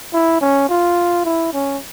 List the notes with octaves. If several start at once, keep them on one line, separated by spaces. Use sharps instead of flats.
E4
C#4
F4
E4
C#4